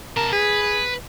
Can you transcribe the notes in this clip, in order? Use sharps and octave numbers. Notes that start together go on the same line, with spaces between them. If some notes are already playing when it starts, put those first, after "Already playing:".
C3 A#4 A5
G#4 B4